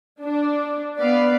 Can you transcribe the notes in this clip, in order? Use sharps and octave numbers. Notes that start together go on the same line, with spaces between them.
D4
B3 B4 D5 F5